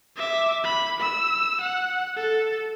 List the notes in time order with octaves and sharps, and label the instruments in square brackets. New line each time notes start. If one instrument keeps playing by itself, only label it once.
[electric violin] E5 D6
B5
E6
F#5
A4